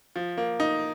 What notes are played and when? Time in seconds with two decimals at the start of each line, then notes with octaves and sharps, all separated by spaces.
0.16 F3
0.38 A#3
0.60 D#4